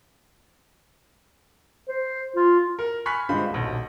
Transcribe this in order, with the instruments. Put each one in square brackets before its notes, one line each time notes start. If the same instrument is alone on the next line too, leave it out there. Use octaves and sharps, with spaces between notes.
[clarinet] C5
F4
[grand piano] A#4
G#5 B5 C#6 F6 F#6 B6
G2 D3 G#3 F4 C5 B5
D#1 B1